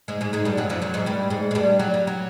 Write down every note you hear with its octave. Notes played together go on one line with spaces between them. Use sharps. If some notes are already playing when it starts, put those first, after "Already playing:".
G#2 G#3
G#2 G#3
G#2 G#3
G2 G3
F#2 F#3
F2 F3
F#2 F#3
G#2 G#3
G2 G3
G#2 G#3
G#3
G2 G3
F#3
G3
F#3